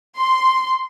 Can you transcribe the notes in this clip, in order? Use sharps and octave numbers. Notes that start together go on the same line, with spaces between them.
C6